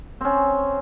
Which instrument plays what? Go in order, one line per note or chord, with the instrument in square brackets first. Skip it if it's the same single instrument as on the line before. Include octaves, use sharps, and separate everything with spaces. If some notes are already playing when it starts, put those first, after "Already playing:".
[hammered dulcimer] C4 C#4